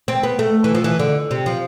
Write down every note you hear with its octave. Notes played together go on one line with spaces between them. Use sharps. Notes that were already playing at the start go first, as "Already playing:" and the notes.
C4
B3
A3
E3
F3
E3
D3
C3
F3